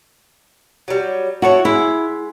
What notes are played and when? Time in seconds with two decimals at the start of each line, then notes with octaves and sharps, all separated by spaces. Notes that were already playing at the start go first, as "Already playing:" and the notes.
0.88 F#3 G3
1.42 E4 F#4 A4 C#5
1.65 G#3 E4